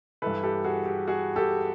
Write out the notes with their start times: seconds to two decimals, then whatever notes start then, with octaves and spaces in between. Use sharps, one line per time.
0.22 G2 E3 A4 B4
0.43 G4 A4
0.64 F#4 G#4
0.86 G4
1.07 F#4 G#4
1.36 G4 A4